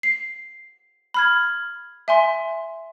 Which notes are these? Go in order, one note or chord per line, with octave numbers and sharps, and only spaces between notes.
C7
B5 F6 G#6
E5 G#5 C6